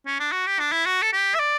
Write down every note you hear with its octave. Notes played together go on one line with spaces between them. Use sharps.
C#4
D4
F#4
G4
D4
E4
F#4
A4
G4
E5
D5